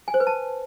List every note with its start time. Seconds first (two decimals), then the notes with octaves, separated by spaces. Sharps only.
0.08 G#5
0.14 C5
0.20 B4
0.27 A5